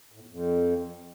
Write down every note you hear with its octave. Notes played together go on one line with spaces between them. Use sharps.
A2
E2
F2